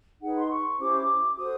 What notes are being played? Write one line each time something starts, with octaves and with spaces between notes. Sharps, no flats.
D#4 G#4 B4 F#5
C6
C#6
C#4 E4 G4 C5 D6
F#4 A4 C5 D#6